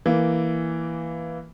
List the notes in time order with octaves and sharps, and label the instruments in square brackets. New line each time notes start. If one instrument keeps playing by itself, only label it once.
[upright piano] E3 A#3